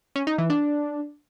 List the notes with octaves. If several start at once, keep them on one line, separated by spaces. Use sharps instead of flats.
C#4
D#4
E3
D4